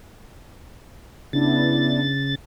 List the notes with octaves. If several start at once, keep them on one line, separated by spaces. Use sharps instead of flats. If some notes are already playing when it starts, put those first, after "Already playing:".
C#3 B3 D4 E4 A6